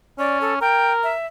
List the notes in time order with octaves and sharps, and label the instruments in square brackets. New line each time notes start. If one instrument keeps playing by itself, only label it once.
[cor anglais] C#4 [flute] D5
[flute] A4
[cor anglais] A#4 [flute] G5
[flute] E5